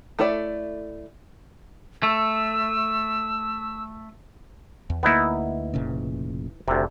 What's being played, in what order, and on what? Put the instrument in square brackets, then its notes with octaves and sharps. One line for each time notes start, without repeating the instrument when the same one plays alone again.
[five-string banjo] A3 E4 A4 C#5 D5
[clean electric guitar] A3 [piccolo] E6
[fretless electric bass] E2
[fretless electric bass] D2 A#3 [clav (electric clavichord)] B3 D#4 E4
[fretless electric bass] F1 A#2 C#3
[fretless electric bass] F1 [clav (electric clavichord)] D2 C3